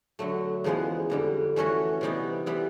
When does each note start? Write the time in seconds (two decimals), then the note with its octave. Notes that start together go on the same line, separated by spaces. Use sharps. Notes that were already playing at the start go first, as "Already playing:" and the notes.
0.19 D3 F#3 A3
0.64 E2 C#3 F3 G#3 B3
1.10 F2 D3 G3
1.56 E3 A3 C#4 F#4
2.01 C3 E3 G3 B3 D#4
2.46 E3 G3 B3 E4